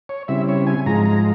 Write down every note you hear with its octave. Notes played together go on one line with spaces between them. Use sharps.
C#5
C#3 G3 C4 E4 E5
C#5
G#5
G#2 F3 G#3 A#5
A#5